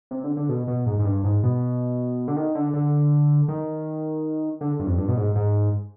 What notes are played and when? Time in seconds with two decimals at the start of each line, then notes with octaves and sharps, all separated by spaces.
0.11 C3
0.24 D3
0.37 D3
0.49 B2
0.67 B2
0.86 G#2
0.99 G#2
1.05 G2
1.24 G#2
1.43 B2
2.28 D3
2.36 D#3
2.55 D3
2.74 D3
3.48 D#3
4.61 D3
4.80 G2
4.86 F2
4.98 G2
5.08 B2
5.17 G#2
5.36 G#2